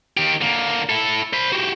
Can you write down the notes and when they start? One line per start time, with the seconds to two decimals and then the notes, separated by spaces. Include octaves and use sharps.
0.17 D#3 G4
0.41 D3 A#3
0.89 E4 A4
1.33 C5 B5
1.52 F#4 G4